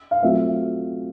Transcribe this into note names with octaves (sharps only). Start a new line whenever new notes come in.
F5
F#3 A3 C4 F4 E5